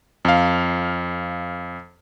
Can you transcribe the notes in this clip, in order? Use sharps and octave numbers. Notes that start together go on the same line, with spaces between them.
F2 F5